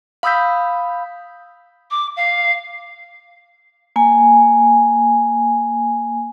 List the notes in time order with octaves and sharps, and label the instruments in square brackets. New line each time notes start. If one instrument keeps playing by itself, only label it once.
[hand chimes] F5 B5 D#6 E6 G6 B6
[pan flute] D6
F5
[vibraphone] A#3 G#5